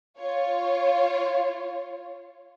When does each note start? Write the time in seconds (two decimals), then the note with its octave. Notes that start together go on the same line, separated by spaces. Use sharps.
0.19 F4 C#5